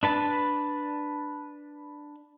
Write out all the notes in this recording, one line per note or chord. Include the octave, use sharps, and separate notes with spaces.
D4 B4 A5